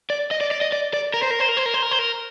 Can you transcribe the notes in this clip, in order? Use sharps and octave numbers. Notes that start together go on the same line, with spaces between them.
D5
D#5
D5
D5
D#5
D5
D5
A#4
C5
A#4
C5
A#4
C5
A#4
C5
A#4
C5
A#4